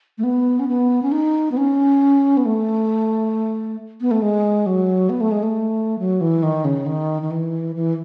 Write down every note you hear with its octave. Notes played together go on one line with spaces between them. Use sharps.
A3
B3
C#4
B3
C#4
D#4
B3
C#4
B3
A3
B3
A3
G#3
F#3
B3
A3
G#3
A3
F#3
E3
D#3
C#3
D#3
D#3
E3
E3